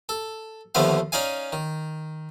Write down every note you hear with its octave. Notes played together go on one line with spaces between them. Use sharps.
A4
D#2 D3 F3 A3 B3 F5
C#4 D#4 D5 F5 G#5
D#3